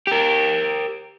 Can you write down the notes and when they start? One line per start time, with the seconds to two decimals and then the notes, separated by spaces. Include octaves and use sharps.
0.07 G4 A#4